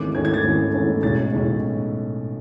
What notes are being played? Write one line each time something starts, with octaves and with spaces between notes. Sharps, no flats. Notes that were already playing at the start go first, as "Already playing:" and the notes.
Already playing: G#1 G#2 E3 A3 C#4 D6
G#1 G#2 E3 A3 C#4 G#6
G#6
A6
G#1 G#2 E3 A3 C#4
G#1 G#2 E3 A3 C#4
B1 A2 G#3 C#4 A6
B1 A2 G#3 C#4